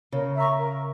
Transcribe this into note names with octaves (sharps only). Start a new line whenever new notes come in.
C#3 A#4
E5 A#5 C#6
A#4